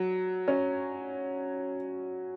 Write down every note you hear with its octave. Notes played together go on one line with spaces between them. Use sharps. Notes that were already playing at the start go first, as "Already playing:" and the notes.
Already playing: F#3
C#4